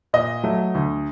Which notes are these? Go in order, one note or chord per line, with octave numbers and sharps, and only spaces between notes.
A#2 D#5
F#3 A3
D2